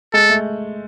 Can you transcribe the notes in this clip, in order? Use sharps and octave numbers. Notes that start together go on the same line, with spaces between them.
G#3 A4
A3